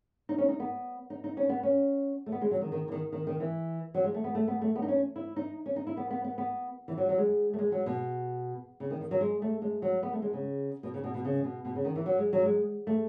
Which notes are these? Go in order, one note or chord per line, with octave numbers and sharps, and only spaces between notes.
D#4
C#4
D#4
B3
D#4
D#4
C#4
B3
C#4
A3
B3
G#3
F#3
D#3
D#3
E3
D#3
D#3
D#3
E3
F#3
G#3
A3
B3
A3
B3
A3
B3
D#4
C#4
E4
D#4
C#4
D#4
E4
B3
B3
B3
B3
E3
F#3
F#3
G#3
A3
G#3
F#3
B2
C#3
D#3
D#3
F#3
G#3
A3
G#3
F#3
B3
A3
G#3
C#3
B2
C#3
B2
B2
C#3
B2
B2
C#3
D#3
E3
F#3
G#3
F#3
G#3
A3